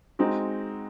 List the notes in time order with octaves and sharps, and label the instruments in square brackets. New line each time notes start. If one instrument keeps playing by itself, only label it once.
[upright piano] G#3 C4 D#4 F#4